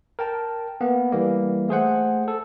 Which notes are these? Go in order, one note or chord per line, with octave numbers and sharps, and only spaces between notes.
A#4 G5 A5
A#3 B3
E3 G3 A#3
A3 G#4 C5 F#5
A4